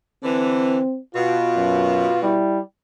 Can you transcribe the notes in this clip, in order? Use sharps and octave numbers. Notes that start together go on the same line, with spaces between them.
D3 E3 C4
B2 F4 F#4
F#2
G3 E4